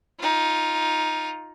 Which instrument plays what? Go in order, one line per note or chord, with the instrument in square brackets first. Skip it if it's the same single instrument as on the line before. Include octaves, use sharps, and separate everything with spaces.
[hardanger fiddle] D#4 F4